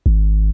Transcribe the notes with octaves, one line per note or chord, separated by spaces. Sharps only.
G#1